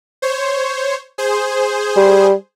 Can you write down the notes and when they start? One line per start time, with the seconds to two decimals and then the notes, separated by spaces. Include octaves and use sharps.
0.22 C5 C#5
1.18 G#4 C5
1.96 G3